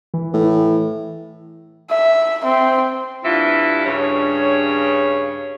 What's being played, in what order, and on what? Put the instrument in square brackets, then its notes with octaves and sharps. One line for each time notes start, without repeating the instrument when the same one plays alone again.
[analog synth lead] E3
[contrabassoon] A2
[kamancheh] E5
C4
[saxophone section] G2 E3 G3 E4 F4 E5
G2 C#3 C#5